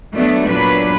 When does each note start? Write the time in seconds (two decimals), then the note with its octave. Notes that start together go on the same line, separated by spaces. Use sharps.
0.14 F#3 A3 B3 D4
0.49 A#2 F#3 D4 B4